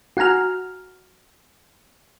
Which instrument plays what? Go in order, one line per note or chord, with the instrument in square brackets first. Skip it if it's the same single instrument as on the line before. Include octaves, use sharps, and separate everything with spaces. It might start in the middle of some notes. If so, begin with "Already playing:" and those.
[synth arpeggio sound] F#4 F#5 G#5 A#5 F6